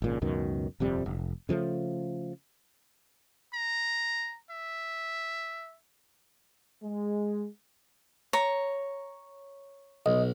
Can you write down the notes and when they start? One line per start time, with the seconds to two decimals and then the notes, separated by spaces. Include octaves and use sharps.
0.02 G#1 A#2 C#3
0.22 C#2 F#2 B2 D#3
0.80 D#1 F2 C3 G3
1.06 F1
1.49 C#3 F3 G#3 A3
3.54 A#5
4.50 E5
6.83 G#3
8.33 C#5 A#5
10.06 B1 D#5